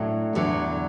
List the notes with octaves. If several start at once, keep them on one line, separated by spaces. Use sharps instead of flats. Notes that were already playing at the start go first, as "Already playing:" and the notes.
Already playing: A2 F#3 A3 D4
E2 D3 F#3